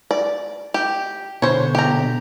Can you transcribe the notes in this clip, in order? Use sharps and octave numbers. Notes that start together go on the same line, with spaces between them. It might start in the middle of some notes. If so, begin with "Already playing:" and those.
D5
G4
B2 D3 C5 C#5
G4 A#5